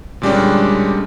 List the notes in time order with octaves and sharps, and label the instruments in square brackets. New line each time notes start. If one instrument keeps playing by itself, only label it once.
[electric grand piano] A#2 D3 G3 G#3 C#4 D4